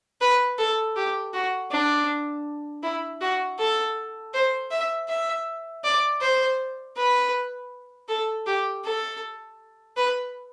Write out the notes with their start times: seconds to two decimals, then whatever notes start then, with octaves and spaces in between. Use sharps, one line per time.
0.21 B4
0.58 A4
0.96 G4
1.33 F#4
1.71 D4
2.83 E4
3.21 F#4
3.59 A4
4.34 C5
4.71 E5
5.08 E5
5.84 D5
6.21 C5
6.96 B4
8.08 A4
8.46 G4
8.84 A4
9.97 B4